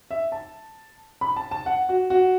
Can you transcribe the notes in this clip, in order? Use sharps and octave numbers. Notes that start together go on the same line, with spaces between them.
E5
A5
B5
A5
A5
F#5
F#4
F#4